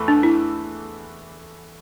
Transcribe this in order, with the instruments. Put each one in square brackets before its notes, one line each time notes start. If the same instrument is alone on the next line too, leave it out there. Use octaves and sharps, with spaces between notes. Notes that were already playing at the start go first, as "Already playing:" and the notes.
Already playing: [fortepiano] E2 E3 A3
[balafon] D4
E4